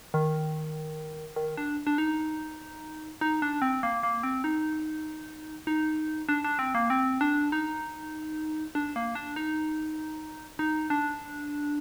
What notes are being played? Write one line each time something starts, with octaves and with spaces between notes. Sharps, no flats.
D#3
D#3
D4
D4
D#4
D#4
D4
C4
A#3
A#3
C4
D#4
D#4
D4
D4
C4
A#3
C4
D4
D#4
D4
A#3
D4
D#4
D#4
D4